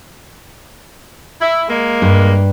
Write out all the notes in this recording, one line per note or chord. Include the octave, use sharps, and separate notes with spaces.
E4
G#3 A#3
G2